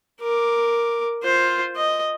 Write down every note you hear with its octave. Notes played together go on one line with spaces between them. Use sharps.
A#4 D6
F4 C5
D#5